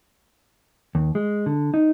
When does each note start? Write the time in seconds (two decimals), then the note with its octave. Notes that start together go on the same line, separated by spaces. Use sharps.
0.95 D#2
1.15 G#3
1.46 D3
1.74 D#4